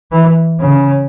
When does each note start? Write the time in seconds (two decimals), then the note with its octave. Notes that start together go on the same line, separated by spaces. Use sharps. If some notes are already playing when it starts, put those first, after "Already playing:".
0.12 E3
0.60 C#3